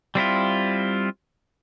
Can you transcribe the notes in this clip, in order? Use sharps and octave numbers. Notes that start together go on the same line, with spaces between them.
G3 C4 E4 F4